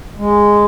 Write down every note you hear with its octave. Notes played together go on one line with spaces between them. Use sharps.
G#3